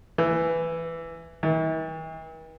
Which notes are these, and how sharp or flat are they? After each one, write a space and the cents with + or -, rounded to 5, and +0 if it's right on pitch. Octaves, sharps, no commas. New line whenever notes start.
E3 +5
E3 -45